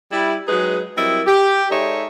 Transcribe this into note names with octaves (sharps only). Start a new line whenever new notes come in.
G3 E4
F#3 G#3 D#4 G#4 B4
F#3 G3 C4 E4 A#4 D#5
G4
G#3 D#4 A4 C#5 D5 E5